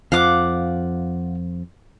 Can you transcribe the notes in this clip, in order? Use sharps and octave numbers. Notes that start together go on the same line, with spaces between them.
F2 F3 F5 F#5 D6